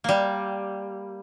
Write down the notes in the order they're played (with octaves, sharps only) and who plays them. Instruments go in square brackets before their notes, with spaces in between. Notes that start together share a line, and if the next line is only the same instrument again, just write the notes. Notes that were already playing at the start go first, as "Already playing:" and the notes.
[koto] G3 A#3